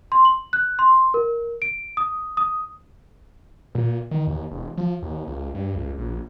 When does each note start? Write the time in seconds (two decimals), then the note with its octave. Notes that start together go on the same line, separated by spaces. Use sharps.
0.12 C6
0.25 F#7
0.53 F#6
0.79 C6
1.14 A#4
1.62 D7
1.97 D#6
2.37 D#6
3.75 A#2
4.11 D#3
4.27 D#2
4.51 E1
4.78 F3
5.02 D#2
5.27 C#2
5.55 G2
5.76 C#2
5.98 A#1